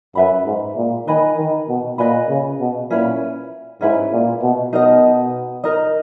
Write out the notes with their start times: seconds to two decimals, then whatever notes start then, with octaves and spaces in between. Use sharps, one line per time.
0.15 F#2 B4 E5 B5
0.45 G#2
0.76 A#2
1.07 D#3 B4 D#5 G#5 B5
1.37 D#3
1.69 B2
1.98 A#2 B4 D#5 G#5 B5
2.28 C#3
2.60 B2
2.90 A#2 C#4 E4 B4
3.81 G#2 C#4 E4 B4
4.12 A#2
4.42 B2
4.73 B2 D#4 A#4 D#5
5.64 D#4 A#4 D#5